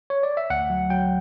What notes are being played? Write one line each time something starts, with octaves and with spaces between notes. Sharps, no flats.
C#5
D5
E5
D2 F#5
F#3
F#3 G5